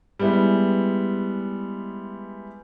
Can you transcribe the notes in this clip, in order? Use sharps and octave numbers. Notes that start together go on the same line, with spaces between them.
G3 G#3 B3 E4